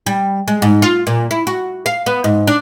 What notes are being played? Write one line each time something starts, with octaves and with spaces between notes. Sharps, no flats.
G3
G#3
G#2
F4
A#2
E4
F#4
F5
B3
G#2
D4